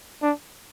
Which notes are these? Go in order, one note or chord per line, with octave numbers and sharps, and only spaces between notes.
D4